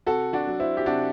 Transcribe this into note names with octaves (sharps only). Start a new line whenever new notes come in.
C3 F#4 A4
D4 F#4
F#3
C4 E4
G4
C3 D4 F#4